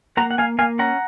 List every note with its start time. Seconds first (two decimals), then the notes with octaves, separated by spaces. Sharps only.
0.17 A#3 F#5 A#5
0.31 F#5
0.38 A#3 F5 G#5
0.58 A#3 F5 G#5
0.79 C#4 F#5 A#5